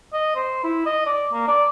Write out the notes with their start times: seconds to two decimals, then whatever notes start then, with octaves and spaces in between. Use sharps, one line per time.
0.13 D#5
0.36 C5
0.64 E4
0.86 D#5
1.06 D5
1.33 A#3
1.48 D5